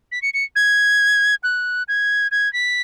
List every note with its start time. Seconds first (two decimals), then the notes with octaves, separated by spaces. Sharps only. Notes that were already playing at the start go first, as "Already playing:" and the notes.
0.12 B6
0.22 C#7
0.34 C#7
0.56 G#6
1.43 F#6
1.88 G#6
2.31 G#6
2.53 B6